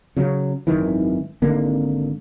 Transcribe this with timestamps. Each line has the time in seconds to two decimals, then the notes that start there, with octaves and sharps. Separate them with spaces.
0.17 C#3 F#3
0.67 G#1 F#2 D#3 E3
1.42 G#1 D3 A#3